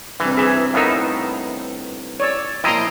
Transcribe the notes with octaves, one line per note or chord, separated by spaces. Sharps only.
G2 C3 E3
E3 G#4 E5
A2 B3 D#4 A#4 E5 F5
C#5 D5 E6
A#2 F3 E4 D#5 G5 A#5 C6